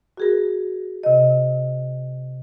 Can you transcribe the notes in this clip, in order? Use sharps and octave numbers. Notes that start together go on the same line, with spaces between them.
F#4 G#4 A#4
C3 D#5